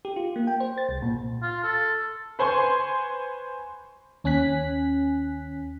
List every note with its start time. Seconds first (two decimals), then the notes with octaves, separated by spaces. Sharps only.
0.05 G4
0.16 F4
0.36 A#3
0.47 G5
0.60 C5
0.78 A6
0.89 C2
1.02 A#2
1.43 F4
1.64 A4
2.39 B4 C5 G#5 C6 C#6
4.24 D#2 C#4 G#5 F#6 B6